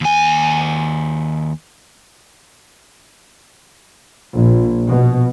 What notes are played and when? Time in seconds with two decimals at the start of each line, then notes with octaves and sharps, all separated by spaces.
0.01 D#2 G#5
4.35 A#1
4.88 B2